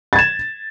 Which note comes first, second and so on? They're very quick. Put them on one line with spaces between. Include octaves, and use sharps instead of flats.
A6 G#6 E7